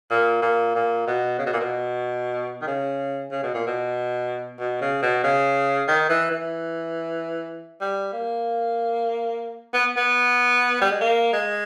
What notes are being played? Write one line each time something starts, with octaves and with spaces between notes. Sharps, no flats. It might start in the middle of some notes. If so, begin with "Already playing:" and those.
A#2
A#2
A#2
B2
C#3
B2
A#2
B2
D#3
C#3
C#3
B2
A#2
B2
B2
C#3
B2
C#3
D#3
E3
E3
G3
A#3
B3
B3
G3
G#3
A#3
G#3